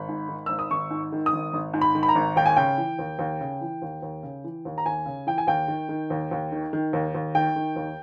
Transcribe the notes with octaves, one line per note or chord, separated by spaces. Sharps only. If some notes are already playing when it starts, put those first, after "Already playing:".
Already playing: G#1 B5
G#2
D#3
G#1 E6
D#6
G#1 C#6
G#2
D#3
D#6
G#1
G#1
G#2
B5
D#3
B5
A#5
G#1
D#2 G5
G#5
C#3 G5
E3
D#2
D#2
C#3
E3
D#2
D#2
C#3
E3
D#2
A#5
D#2 G#5
C#3
E3 G5
G#5
D#2 G5
D#3
D#3
D#2
D#2
D#3
D#3
D#2
D#2
D#3 G5
D#3
D#2